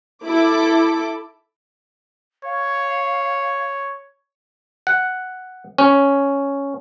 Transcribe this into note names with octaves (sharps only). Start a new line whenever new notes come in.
E4 A4 D6
C#5 F5
F#5
C#4